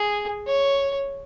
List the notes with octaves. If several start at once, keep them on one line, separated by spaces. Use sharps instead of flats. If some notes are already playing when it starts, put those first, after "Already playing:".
Already playing: G#4
C#5